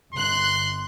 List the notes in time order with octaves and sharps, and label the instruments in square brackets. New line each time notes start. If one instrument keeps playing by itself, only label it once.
[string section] G1 F#6 [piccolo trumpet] C6